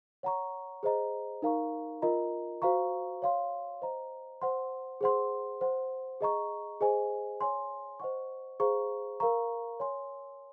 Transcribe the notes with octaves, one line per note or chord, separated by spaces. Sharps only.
C#5 F#5 A#5 C#6
G#4 C5 D#5 A#5
D#4 A#4 F5 A#5 C#6
F4 A#4 D#5 A#5
F#4 C5 F5 A#5 C#6
C#5 F5 C6
C5 D#5 A#5
C5 F#5 C6
G#4 C5 F#5 C6
C5 F#5 C6
G#4 D#5 A#5 C#6
G#4 C5 D#5 G#5
C#5 G#5 C6
C5 D#5 F#5 C#6
G#4 C5 F5 A#5 C#6
A#4 F5 A#5 C#6
C#5 G#5 C6